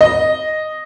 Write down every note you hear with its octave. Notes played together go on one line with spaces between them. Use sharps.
D#5